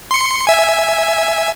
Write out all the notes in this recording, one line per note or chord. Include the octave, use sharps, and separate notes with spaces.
C6 C#7
E5 G#5